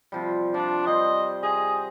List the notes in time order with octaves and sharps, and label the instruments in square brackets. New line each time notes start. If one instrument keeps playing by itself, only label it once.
[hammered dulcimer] C3 F3 G3
[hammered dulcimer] F3 [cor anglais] D4
[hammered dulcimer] G3 C5 [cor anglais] D#5
[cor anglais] G#4 [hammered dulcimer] D#5